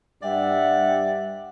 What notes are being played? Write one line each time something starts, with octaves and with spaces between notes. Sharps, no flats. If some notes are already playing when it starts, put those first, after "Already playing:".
G2 G3 D5 E5 F#5 G5